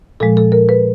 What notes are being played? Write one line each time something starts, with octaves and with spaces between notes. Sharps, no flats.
A#2 F3 G#3 A4
A4
A#4
B4